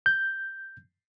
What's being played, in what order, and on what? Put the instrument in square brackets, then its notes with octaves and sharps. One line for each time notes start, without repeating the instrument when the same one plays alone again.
[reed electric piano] G6